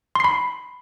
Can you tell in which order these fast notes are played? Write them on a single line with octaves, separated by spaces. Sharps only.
C6 C7 B5